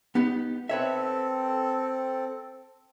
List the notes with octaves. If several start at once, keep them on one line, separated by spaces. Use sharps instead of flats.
B3 D#4 G4
C4 A4 B4 C#5 E5